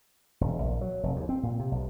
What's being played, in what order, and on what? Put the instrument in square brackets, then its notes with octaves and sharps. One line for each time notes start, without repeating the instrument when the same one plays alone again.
[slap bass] E1
A#1
F#3
F1
D#2
C4
A#2
C3
B1